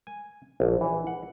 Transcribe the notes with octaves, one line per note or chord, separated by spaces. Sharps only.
G#5
A#1
E3
F#5